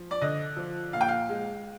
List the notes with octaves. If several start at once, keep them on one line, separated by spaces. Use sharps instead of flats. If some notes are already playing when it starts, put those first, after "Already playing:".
Already playing: F3
D5
D3 D#5
F3
A#2 F5
G5
F5
G#3